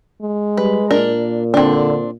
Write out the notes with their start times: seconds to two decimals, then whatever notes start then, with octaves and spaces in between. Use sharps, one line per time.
0.22 G#3
0.57 G3 B4
0.91 A#2 D4 A#4
1.54 D3 C4 D4